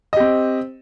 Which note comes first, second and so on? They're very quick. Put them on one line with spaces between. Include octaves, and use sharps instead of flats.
D#5 G4 C4